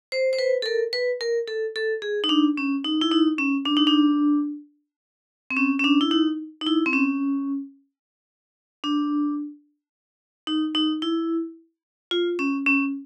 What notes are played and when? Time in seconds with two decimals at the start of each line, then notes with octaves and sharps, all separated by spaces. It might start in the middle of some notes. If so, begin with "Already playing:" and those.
0.12 C5
0.33 C5
0.39 B4
0.62 A4
0.66 A#4
0.93 B4
1.21 A#4
1.48 A4
1.76 A4
2.02 G#4
2.24 D#4
2.29 D4
2.57 C#4
2.85 D#4
3.01 E4
3.11 D#4
3.38 C#4
3.65 D4
3.77 D#4
3.87 D4
5.51 C4
5.57 C#4
5.79 C#4
5.84 D4
6.01 E4
6.11 D#4
6.61 D#4
6.66 E4
6.86 C4
6.93 C#4
8.84 D4
10.47 D#4
10.75 D#4
11.02 E4
12.11 F4
12.39 C#4
12.66 C#4